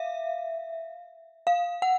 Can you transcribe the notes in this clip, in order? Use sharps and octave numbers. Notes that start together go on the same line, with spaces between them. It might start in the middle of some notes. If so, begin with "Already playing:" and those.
Already playing: E5 F5
F5
F#5